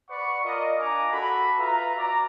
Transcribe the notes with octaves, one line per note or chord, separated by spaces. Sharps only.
B4 D5 F#5 C#6
F4 A#4 D5 D#5
D4 F4 A#4 G#5 A#5 D6
F#4 A4 B5
F4 B4 E5 A#5
F#4 D5 A#5